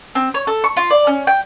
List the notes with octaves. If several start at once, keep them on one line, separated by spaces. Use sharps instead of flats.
C4
C#5
A4
C#6
F4
D5
C#4
G5